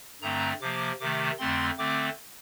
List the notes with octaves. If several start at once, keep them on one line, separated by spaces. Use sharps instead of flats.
G2 D3 A3 C4 A#5
C3 F3 A#3 D6
C3 D#3 A3 D6
F2 D3 A3 C4 C6
D3 A3 C4 D6